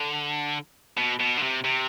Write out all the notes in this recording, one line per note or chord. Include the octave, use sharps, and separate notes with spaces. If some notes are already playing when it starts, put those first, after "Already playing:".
Already playing: D3
B2
B2
D3
C3
C3